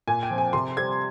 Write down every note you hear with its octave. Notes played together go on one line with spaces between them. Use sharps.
A#2 G#5
G5
F3 C4
G#5
C3 C6
G3 C4 G#6